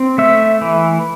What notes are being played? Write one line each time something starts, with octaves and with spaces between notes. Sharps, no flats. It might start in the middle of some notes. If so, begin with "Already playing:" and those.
Already playing: C4
A3 E5
E3